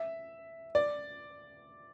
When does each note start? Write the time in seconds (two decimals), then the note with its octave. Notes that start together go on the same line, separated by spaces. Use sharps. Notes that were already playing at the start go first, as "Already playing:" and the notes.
Already playing: E5
0.75 D5